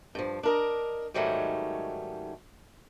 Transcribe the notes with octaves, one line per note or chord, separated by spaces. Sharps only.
G2 F3
D4 A#4 D#5
G#2 D#3 F#3 G3 A3 C#4